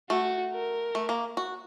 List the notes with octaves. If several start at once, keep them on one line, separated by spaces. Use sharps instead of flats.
A3 F#4
A#4
A3
A#3
F#4